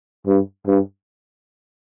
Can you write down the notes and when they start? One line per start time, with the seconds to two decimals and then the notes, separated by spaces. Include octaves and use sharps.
0.27 G2
0.67 G2